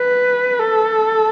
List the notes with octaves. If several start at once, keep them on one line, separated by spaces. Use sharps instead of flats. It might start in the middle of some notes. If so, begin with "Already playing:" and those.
Already playing: B4
A4